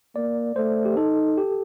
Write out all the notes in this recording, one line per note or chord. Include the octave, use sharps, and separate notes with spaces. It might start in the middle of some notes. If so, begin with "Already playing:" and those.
A#3 D5
A3 C5
G4
D#4 A4
G4